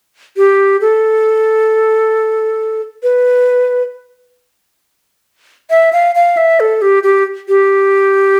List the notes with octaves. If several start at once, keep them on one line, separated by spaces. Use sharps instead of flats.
G4
A4
B4
E5
F5
F5
E5
A4
G4
G4
G4